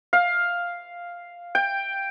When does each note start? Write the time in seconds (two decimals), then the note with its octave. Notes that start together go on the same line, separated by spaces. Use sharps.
0.13 F5
1.55 G5